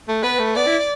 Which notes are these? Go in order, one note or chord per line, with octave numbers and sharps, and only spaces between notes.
A3
B3 B4
A3
B3 D5
E4